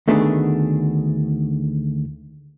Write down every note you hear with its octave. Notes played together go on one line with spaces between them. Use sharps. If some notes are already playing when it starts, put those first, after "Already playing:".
D2 D#3 A3 B3 D4 G#4